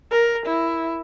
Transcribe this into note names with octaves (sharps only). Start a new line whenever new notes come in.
A#4
E4